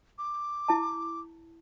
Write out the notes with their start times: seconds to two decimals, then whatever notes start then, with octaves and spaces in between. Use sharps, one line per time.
0.18 D6
0.68 E4 A5